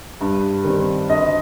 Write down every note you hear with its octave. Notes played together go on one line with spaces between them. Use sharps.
G2
D#3 G3 C4
D2 D#5